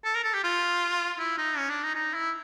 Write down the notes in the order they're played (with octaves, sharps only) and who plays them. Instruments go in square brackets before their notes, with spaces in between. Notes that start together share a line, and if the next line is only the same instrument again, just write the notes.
[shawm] A4
A#4
A4
G4
F4
E4
D#4
C#4
D4
D#4
D#4
E4